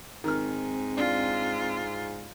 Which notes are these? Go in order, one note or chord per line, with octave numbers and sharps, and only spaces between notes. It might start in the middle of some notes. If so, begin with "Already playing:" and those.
G#2 D#3 C4 F6
D4 F4